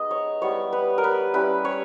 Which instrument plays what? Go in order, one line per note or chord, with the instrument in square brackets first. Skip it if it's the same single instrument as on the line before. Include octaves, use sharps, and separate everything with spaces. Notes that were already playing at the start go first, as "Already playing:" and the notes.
Already playing: [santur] G#3 B3 D#4 D#5
C#5
G3 B3 E4 C#5
B4
A#4
B4
G3 C#4 E4 B4
C#5